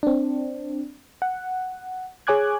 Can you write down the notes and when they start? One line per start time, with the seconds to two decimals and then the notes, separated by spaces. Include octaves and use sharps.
0.03 C4 D4
1.22 F#5
2.27 G#4 C#5 G#5 D6 F#6 G#6